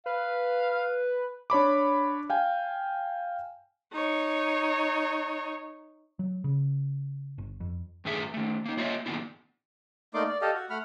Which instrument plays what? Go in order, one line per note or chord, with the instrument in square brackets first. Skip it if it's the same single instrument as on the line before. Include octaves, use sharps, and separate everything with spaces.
[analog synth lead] B4 [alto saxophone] F5
[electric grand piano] D4 C#5 B5 D6
F5 G5 G#5
[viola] D#4 C#5
[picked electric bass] F#3
C#3
G1
F2
[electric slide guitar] G2 D#3 A3 G#4 E5
D#3 A3
A#3 D#4
A#3 F4 C#5 D#5 E5
D#3 F#3 A#3 B3 D4 E4
[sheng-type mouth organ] A3 A#3 D#4 D5 C6 D6
D5
G4 A4 D#5 F5
F#4
A3 F#5 B5 F6